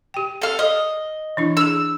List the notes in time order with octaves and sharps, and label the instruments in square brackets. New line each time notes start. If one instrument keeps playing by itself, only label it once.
[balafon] G4 G5
[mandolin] A4 F5
D#5
[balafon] E3 D4 E4
[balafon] D4 G#4 [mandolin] E6